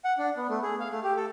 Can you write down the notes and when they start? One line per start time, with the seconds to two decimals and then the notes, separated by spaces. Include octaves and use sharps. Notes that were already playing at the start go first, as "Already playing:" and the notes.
0.05 F#5
0.18 D4
0.37 B3
0.49 A3
0.63 G#4
0.80 F5
0.91 A3
1.04 G4
1.17 A4